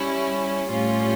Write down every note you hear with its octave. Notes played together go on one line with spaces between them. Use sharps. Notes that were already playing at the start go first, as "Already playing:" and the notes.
Already playing: G3 C#4 E4
A2 G3 C#4 F4